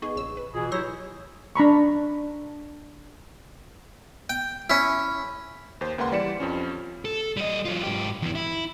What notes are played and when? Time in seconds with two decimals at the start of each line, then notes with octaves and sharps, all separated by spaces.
0.02 B3 D#4 G#4 C#6
0.16 A#1 C#3 E6
0.37 B4
0.54 B2 E3 F4 G#4 G#5
0.72 F#3 E4 G4 C#5 C6 E6 G6 A#6
1.56 D4 A#5 B5 C#6
4.30 G5
4.70 C#4 E4
5.81 D#2 C5
5.98 C#2 A#3 B4 F#5 C6
6.12 E3 G3 D5 B6 C#7 E7
6.40 F2 F3 C#4
7.05 A4
7.37 G3 D#5
7.65 F#3 F4
7.84 G#2 G4
8.22 E2 E3
8.35 E4